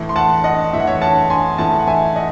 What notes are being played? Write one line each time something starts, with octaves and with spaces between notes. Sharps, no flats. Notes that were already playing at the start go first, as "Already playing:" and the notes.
Already playing: A2 E3
C6
F#5 A5
D#5 F#5
A2 E3 E5 F#5
C#5 E5
F#5 A5
G#5 C6
A2 E3 F#5 A5
F#5
E5 G#5
D#5 F#5